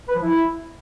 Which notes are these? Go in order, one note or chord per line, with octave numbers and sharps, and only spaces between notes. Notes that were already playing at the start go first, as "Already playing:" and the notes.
B4
F3
E4